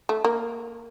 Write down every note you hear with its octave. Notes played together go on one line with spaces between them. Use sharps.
A3
A#3